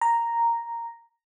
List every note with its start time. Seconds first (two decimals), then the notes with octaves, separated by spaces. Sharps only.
0.01 A#5